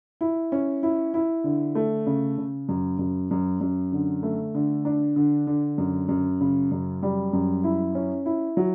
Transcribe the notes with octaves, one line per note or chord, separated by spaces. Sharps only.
E4
C#4
E4
E4
D3
A3
C#3
C#3
F#2
F#2
F#2
F#2
D3
A3
D3
D4
D3
D3
F#2
F#2
C#3
F#2
G3
F#2
E4
C#4
E4
F#3